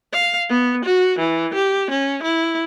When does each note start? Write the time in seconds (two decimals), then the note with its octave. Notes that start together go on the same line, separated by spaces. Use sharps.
0.12 F5
0.50 B3
0.85 F#4
1.19 E3
1.54 G4
1.91 C#4
2.23 E4